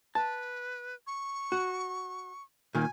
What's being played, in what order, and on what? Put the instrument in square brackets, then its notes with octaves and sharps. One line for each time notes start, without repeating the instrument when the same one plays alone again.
[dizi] B4 [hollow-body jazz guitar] A5
[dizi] C#6
[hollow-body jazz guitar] F#4
[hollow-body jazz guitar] A#2 D#3 A#3 [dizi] G#5